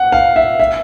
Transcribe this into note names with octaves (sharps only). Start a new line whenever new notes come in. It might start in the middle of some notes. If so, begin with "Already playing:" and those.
Already playing: F#5
F5
E5
E5